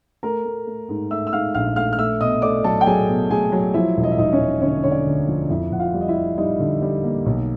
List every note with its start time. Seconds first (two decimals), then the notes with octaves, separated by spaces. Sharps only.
0.23 A3 A#4 A#5
0.45 A3
0.67 A3
0.89 G#2
1.11 A3 E5 E6
1.27 E6
1.33 G#2 F5 F6
1.55 A#1 F5 F6
1.76 A3 F5 F6
1.93 F6
1.98 A3 E5 E6
2.21 B2 D#5 D#6
2.42 A3 D5 D6
2.64 F#3 A4 A5
2.81 G5
2.86 F#3 G#4 G#5
3.08 B2
3.31 A3 G#4 G#5
3.52 F#3
3.74 F3 E4 E5
3.97 E1
4.03 D#5
4.11 E5
4.18 E1 D#4 D#5
4.33 C#4 C#5
4.40 E1
4.62 D3 C#4 C#5
4.83 D3 C#5
4.91 D4 D5
5.06 D2
5.28 F3
5.49 F2 E4 E5
5.72 F2 F#5
5.80 F4 F5
5.94 G3
6.01 D#5
6.08 E4 E5
6.16 G3
6.38 G3 D#4 D#5
6.60 D3
6.82 G3
7.04 A#3
7.26 B1